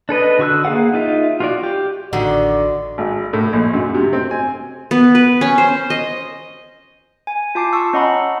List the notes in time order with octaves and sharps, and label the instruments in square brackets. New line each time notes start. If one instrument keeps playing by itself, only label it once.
[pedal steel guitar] D4 A4 B4 D#5
D3 F#4 C#6 E6 F#6
A#3 G#4 F5 F#5
D#4 F4 E5
F4 F#4 D5
G4
[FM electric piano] A1 F#4 [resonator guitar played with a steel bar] D3 D#3 [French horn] D5
[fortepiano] G#1
A2
A#1
F#2
C3
C4
G#5
[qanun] B3
B4
C#4
C5
D#5
[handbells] G#5
F4 A5 D6 C7
A5 C#6 E6
C#4 D#5 F#5 A#5 B5